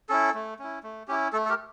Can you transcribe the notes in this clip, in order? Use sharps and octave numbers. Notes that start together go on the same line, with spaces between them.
C#4 E4 A4
A3
C#4 E4
A3
C#4 E4 G4
A3 A4
A4
G4 A#4